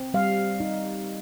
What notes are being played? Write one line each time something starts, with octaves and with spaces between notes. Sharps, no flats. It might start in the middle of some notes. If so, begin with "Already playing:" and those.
Already playing: C4
G3 F5
D#4